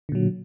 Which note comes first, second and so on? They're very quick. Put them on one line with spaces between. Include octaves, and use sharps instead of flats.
D3 A#2 F#3